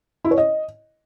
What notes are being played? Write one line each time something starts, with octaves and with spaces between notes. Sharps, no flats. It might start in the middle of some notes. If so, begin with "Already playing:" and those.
E4
C#5
D#5